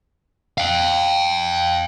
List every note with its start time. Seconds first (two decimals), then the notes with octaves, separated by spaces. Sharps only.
0.58 F5 G5